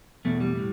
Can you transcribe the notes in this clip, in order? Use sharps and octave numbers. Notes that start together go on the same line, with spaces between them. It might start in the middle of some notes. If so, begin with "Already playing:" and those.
E2 B2 A3
G3
A2